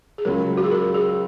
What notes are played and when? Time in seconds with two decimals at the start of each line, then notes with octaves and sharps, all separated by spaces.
0.18 G#4
0.25 C#2 C#3 F#3 A#4
0.57 F#4
0.64 G#4
0.71 A#4
0.95 G#4